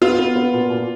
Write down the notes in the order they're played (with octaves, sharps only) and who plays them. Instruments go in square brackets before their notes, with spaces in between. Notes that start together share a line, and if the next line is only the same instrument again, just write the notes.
[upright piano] B3 [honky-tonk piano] F4
[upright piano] B3
B3
A#2
A#2